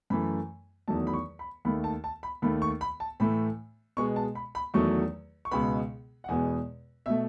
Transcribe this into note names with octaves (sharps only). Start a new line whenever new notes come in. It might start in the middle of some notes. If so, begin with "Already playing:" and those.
F#2 E3 A3 B5
E2 D#3 F#3 A3 A5
B5
C#6
B5
D#2 D#3 A3 B5
A5
A5
B5
D#2 D#3 A3 B5
C#6
B5
A5
A2 E3 A3 B5
B2 G#3 B3 C#6
A5
B5
B5
E2 D#3 F#3 A3 C#6
C#6
C#2 B2 G#3 B3 B5
F#5
E2 B2 G#3 B3 G#5
B2 A3 E5